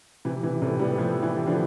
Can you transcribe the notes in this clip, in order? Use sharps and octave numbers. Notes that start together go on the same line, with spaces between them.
C3 E3
C3 E3
A2 C3
G3 B3
F3 A3
E3 G3
D3 F3